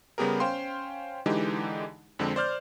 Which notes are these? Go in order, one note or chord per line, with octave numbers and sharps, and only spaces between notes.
C#3 G3 B3 G4 G#4 A#4
C#4 C5 F5 G5 C6
D3 E3 G#3 D#4 G4
F2 D3 G#3 C4
C5 D5 F6 G6